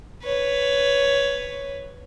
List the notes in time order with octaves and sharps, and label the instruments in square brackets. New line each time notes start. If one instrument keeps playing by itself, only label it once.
[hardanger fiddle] B4 C#5